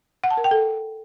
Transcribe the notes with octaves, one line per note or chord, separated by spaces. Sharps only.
F#5
A5
A#4
G5
A4